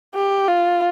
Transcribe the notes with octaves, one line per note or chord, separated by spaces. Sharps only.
G4
F4